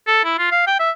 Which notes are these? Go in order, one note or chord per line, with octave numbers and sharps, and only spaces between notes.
A4
E4
F4
F5
G5
E5